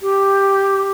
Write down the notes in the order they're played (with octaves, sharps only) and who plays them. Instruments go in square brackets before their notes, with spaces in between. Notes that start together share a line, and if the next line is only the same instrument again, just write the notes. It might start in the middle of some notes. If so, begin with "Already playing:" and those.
[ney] G4